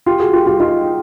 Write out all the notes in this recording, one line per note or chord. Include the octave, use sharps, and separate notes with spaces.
F4 G4
F#4 G#4
F4 G4
F4 G4
D#4 F4